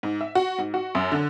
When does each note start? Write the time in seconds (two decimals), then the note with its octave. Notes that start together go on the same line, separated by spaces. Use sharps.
0.03 G#2
0.21 E5
0.35 F#4
0.58 G#2
0.74 F#4
0.95 F#2
1.12 D3